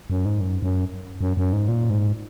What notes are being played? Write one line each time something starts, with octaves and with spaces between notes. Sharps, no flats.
F#2
G#2
F#2
F#2
F#2
F#2
G#2
A#2
G#2